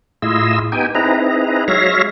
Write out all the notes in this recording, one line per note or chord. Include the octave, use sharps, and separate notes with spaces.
A2 E4 F4 G#4 D#5 E6
B3 D#4 G4 G5 G#5
C4 D#4 E4 G#4 B4 A#5
F#3 G#3 C#5 E5 F5 A#6